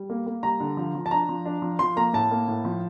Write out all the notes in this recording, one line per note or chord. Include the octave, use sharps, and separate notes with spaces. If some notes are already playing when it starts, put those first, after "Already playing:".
Already playing: G3
A#3
A#3
G3 A#5
D3
F3
F3
A5
D4 A#5
F3
D4
F3
F3 C6
A#3 A#5
A2 A5
A#3
A2
F3